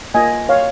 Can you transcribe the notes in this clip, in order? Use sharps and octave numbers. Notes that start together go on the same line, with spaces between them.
A#3 F4 D#5 G#5
C#5 F5